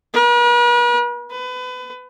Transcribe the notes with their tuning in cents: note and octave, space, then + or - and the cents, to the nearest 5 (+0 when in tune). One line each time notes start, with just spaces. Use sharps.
B4 -45
B4 +30